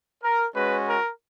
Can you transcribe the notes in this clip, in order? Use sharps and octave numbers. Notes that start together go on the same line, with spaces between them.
A#4
G#3 C#4 F#4 B4
A#4